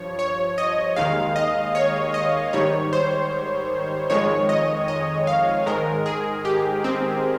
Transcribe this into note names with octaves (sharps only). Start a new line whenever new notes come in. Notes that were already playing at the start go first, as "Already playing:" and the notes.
Already playing: G2 F3 C#5
C#5
D#5
D#2 D#3 G#3 F5
D#5
C#5
D#5
G#2 D#3 G3 C#5
C5
F2 D#3 G#3 C#5
D#5
D#5
F5
G#2 D#3 G#3 A#4
G#4
G4
C4